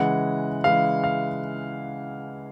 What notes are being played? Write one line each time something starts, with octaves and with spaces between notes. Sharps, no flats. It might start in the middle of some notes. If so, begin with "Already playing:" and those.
Already playing: C#3 E3 G#3 F#5
C#3 E3 G#3 F5
F5